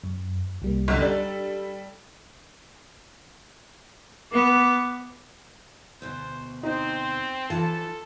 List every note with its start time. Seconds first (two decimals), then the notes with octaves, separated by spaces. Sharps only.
0.04 F#2
0.62 C2 G3 A#3
0.88 B1 F#2 D3
1.00 G3 D4 A4
4.32 B3 D6
6.02 D2 B2 C5
6.63 C4 D#4 C5
7.50 E3 F3 F4 A4 A5